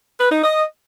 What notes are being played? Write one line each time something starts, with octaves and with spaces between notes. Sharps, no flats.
B4
D#4
D#5